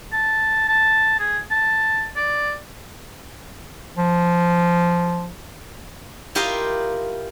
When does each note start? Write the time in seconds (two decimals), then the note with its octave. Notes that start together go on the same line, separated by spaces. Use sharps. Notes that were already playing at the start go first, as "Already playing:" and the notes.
0.13 A5
0.68 A5
1.19 G#4
1.51 A5
2.16 D5
3.97 F3
6.35 E4 F4 G4 A#4 D#5 F5